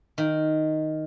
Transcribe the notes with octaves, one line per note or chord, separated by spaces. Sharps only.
D#3